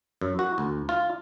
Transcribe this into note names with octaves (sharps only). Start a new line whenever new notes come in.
F#2
F#4
D2
F4